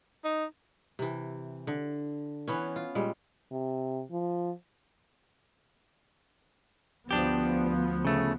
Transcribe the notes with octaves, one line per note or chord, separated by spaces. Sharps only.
D#4
C3 E3
D3
E3 B3 C#4
F4
A#2 G3 G#3
C3
F3
D2 F3 B3 D4 G4
C#3 A3